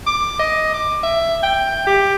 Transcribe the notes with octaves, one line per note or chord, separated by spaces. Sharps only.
D6
D#5
D6
E5
G5
G4